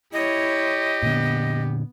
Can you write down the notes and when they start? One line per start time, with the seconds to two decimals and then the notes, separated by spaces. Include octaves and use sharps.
0.13 E4 G4 C#5 D#5
1.03 A#2 D3 B3